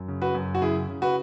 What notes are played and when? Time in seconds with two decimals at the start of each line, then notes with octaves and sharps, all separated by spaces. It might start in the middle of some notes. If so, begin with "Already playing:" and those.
Already playing: F#2
0.08 C#3
0.22 F#4 B4
0.35 F#2
0.55 F#4
0.62 C#3 E4 G#4
0.89 C#3
1.02 F#4 B4